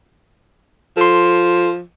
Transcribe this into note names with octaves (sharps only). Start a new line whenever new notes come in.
F3 A4 C6